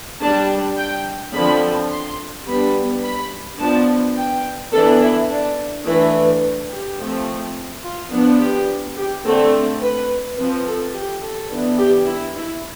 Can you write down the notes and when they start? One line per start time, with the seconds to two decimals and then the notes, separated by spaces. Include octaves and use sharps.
0.21 G3 D4 A5
0.78 G5
1.34 D3 F3 C4 B5
1.90 C6
2.46 G3 B3 D4 B5
3.03 B5
3.59 F3 B3 D4 A5
4.16 G5
4.72 E3 B3 D4 A4
5.01 E4
5.29 D4
5.85 E3 A3 D4 E4
6.70 G4
6.98 F3 A3 C4
7.83 F4
8.11 F3 B3 D4
8.39 G4
8.96 G4
9.24 D3 A3 C4 A4
9.81 B4
10.37 F3 C4 B4
10.65 A4
10.93 G4
11.22 A4
11.50 E3 B3 D4
11.78 G4
12.07 E4
12.36 E4